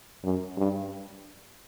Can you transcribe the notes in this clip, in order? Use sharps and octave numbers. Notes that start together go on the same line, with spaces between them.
F#2
G2